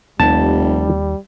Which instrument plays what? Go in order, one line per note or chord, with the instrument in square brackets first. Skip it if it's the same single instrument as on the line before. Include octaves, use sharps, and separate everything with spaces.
[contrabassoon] F1 [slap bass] D#2 [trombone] G3 [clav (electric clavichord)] A5